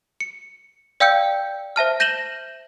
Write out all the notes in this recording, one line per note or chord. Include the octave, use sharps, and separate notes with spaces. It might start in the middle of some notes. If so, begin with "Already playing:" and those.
C#7
D5 F5 G5 E6 G6 C#7
C5 E5 A5 F6
G6 A#6 D#7 E7 F#7 G7